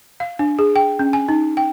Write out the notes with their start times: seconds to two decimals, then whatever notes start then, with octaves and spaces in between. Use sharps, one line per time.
0.20 F5
0.39 D4
0.59 G#4
0.76 G5
0.99 C#4
1.13 G#5
1.29 D#4
1.57 G5